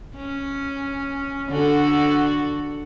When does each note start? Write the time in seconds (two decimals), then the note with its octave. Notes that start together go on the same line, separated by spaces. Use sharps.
0.15 C#4
1.49 D3 F#4 A4